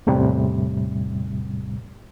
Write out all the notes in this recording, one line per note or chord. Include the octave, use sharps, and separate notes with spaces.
E2 A2 C3 G3